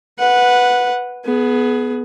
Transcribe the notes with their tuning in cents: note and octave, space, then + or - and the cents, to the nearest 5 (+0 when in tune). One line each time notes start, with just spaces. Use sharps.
B4 +0 F#5 -10
B3 +0 G#4 +25